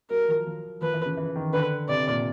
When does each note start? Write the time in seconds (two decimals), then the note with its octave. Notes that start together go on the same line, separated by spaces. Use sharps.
0.10 F#3 A#4
0.28 F3
0.46 F3
0.82 F3 B4
0.94 E3
1.06 C#3
1.17 E3
1.36 D#3
1.53 D3 B4
1.89 C3 D5
2.07 A#2